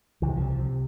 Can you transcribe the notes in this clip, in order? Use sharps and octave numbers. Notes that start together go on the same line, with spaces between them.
C2 E3
C3 F3
F3
C3